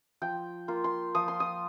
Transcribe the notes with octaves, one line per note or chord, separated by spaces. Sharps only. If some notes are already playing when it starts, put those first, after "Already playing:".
F3 G5
A#3 F4
C6
F3 D#6
C6
D#6